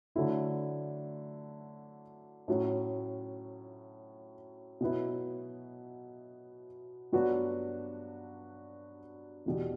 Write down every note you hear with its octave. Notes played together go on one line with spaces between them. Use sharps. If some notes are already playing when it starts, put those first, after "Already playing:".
D3 F#3 A3 E4
A2 F#3 C#4
B2 F#3 B3 E4
G2 F#3 B3 D4 F#4
E2 B2 G3